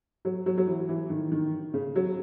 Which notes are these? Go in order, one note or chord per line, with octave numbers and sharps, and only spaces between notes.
F#3
F#3
F#3
E3
E3
D#3
D#3
C#3
F#3